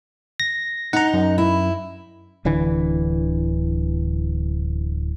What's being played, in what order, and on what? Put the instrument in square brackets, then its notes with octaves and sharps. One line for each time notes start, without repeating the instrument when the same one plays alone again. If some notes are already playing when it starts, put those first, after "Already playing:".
[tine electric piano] A#6
[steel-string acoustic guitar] D#4 [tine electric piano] F#5 A#5
[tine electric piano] F#2
[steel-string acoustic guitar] E4
[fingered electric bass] D1 D3 E3